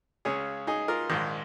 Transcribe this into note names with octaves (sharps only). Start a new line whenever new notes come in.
C#2 C#3 G#4 C#5
D#4 G#4
F4 A#4
A#1 G#2 D#3